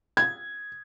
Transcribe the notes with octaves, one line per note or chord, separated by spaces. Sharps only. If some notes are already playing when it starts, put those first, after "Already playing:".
G#6